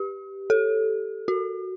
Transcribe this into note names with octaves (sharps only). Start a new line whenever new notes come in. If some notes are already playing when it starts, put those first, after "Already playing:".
Already playing: G4
A4
F#4